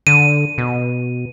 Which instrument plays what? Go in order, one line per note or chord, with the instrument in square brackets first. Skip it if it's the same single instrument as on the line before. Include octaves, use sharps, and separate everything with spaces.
[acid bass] D3 [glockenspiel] D#7
[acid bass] B2